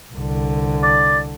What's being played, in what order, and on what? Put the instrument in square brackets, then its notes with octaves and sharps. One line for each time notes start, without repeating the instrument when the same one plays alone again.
[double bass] C2 D3
[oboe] D5